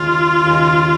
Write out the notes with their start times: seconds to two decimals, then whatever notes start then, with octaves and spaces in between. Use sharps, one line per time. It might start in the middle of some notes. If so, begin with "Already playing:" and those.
Already playing: D#2 C#3 G#3 F4
0.43 D#2 C#3 G#3